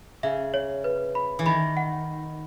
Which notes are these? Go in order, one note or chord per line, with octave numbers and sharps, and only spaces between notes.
C#3 E5
C#5
B4
B5
E3
D#3 B5
F#5